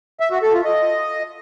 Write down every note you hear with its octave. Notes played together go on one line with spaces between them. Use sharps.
E5
F#4
A4
F4
D#5